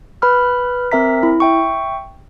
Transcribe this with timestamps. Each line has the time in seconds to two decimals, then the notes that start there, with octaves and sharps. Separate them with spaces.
0.22 B4 B5 F6
0.91 C4 A#4 E5 A#5 B6
1.23 E4
1.40 E5 G5 C#6